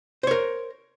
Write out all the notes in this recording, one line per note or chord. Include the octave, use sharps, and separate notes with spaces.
A#4 C5 C#5